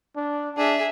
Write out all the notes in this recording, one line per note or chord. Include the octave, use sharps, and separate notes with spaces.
D4
D4 G#4 E5